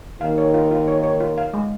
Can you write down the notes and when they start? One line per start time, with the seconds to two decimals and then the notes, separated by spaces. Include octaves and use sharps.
0.21 D#2 D#3 F5
0.38 C#5
0.54 F4
0.71 F4
0.88 C#5
1.04 C#5
1.20 F4
1.38 F5
1.53 G#3